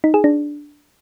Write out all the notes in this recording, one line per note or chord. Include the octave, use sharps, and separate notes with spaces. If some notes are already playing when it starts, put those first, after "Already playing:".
D#4
G#4
D4